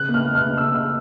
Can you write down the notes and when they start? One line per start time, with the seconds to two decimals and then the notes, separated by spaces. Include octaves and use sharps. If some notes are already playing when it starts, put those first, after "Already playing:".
Already playing: C#3 F#6
0.09 A#3
0.14 F6
0.25 A#3
0.35 F6
0.41 C#3
0.57 C#3 E6
0.74 C#3 E6